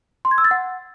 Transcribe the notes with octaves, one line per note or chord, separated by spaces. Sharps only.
C6
G#6
E6
A6
F#5